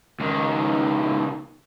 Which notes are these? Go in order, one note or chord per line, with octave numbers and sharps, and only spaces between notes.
C#2 D#3